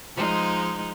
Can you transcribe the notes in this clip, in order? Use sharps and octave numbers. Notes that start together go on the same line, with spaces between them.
F3 G#3 D#4